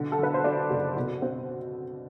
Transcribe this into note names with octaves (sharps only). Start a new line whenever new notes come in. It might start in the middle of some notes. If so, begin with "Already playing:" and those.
Already playing: B2 D3
A4
D3 B4
C5
D3 D4 D5
F#1
B2
C4